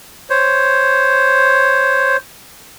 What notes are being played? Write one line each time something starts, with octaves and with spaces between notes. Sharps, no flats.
C5 C#5